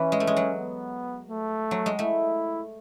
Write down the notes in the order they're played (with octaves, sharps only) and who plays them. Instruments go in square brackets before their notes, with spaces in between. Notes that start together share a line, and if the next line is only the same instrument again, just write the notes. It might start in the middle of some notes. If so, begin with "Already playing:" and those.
Already playing: [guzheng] E3 [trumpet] C#4
[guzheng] G#3
A3
G#3
F#3
[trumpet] B3
A3
[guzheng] F#3
G#3
[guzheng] A3 [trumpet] E4